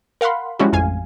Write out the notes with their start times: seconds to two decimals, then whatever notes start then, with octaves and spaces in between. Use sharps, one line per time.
0.21 A#4 F5 F#5 B5 C6
0.59 F3 G3 G#3 C#4 E4 F#4
0.73 A1 F2 F5 G#5